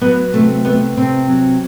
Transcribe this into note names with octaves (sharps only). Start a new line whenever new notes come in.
F#3 B3
C3 A3
A3 B3
C3 C4
F#3